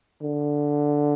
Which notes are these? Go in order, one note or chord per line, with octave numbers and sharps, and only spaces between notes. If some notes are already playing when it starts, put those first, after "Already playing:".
D3